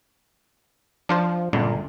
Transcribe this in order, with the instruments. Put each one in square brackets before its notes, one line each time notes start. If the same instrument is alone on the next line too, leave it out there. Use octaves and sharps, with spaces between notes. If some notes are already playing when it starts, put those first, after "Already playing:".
[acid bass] F3 [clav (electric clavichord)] D4 F4 C5
[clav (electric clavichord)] G1 C#2 D3 [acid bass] A#2